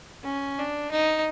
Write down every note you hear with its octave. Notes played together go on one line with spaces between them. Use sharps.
C#4
D4
D#4